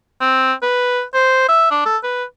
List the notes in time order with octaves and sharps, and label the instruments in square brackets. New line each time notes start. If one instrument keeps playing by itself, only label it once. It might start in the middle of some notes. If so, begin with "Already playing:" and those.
[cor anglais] C4
B4
C5
E5
D4
A4
B4